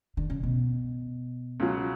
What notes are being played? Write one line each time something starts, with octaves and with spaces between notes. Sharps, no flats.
D3
C#3
B2
C#2 C#3 F#3